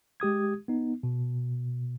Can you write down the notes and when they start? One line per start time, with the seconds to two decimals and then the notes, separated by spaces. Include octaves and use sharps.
0.20 G#3 G4 D#6 G#6
0.68 B3 D#4
1.03 B2